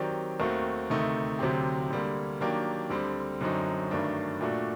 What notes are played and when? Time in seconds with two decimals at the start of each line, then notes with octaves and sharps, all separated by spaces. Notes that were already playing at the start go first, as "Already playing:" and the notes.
Already playing: D#3 F#3 C4 G4 D5
0.40 D#2 D#3 A3 C4 F#4
0.90 D2 C3 D#3 A3 D#4
1.39 D2 C3 F#3 C4 G4
1.91 D2 D3 G3 A#3
2.41 D#3 F#3 A#3 D4 G4
2.90 D2 D3 G3 C4
3.41 F#2 D3 F#3 C4 D#4
3.91 G2 D#3 F#3 A3 D4
4.41 A#2 A3 D4 F#4